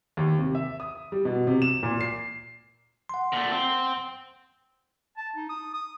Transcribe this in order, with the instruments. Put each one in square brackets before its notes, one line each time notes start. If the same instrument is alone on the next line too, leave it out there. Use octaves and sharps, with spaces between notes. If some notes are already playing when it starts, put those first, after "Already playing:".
[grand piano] D#2
C3
E5
D#6
G3
B2
C3
E7
A#2
C7
[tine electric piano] F#5 C6
[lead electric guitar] A#2 A3
C4
[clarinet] A5
D#4
D#6
D#6